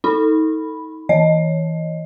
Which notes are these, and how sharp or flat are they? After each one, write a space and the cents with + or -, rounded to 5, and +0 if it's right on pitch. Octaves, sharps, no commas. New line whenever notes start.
D#4 +30 B5 +0
E3 -20 D#5 +0